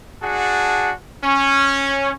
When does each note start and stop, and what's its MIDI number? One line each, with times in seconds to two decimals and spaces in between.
0.23 0.93 62
0.23 0.93 66
0.23 0.93 68
0.23 0.93 78
0.23 0.93 81
1.24 2.12 61